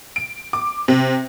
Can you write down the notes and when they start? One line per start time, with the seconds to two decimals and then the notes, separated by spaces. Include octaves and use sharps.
0.16 D7
0.53 D6
0.88 C3